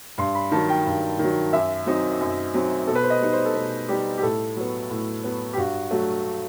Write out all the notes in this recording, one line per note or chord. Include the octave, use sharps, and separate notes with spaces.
G2 C6
B5
D#3 F#3 A5
G5
G2
D#3 F#3
F#2 E5
F#3 C4 D#4
F#2
F#3 C4 D#4
B2 A4
B4
C5
D#5
G3 D#4
C5
A4
B2 B4
G3 D#4 G4
G4
A2 A4
F#3 B3
A2
F#3 B3
G4
G2 F#4
F#3 A3